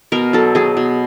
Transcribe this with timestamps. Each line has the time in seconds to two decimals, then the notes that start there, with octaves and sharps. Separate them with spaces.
0.12 B2 A#4
0.33 F#3 A4
0.55 F#3 G#4
0.77 B2